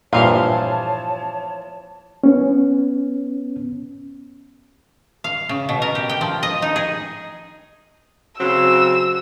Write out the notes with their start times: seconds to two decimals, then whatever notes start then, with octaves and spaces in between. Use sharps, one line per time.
0.13 G2 A#2 E3 F3 C#5 F5 A5
2.24 B3 C#4
5.24 F5
5.49 C#3
5.69 B2
5.82 A#4
5.95 G4
6.09 G5
6.21 F3
6.43 D#5
6.62 D#4
6.76 G#4
8.40 C#3 F#3 C4 E6